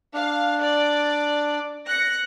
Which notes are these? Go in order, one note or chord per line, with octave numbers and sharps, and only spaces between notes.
D4 F5
D5
F#6 A#6 C#7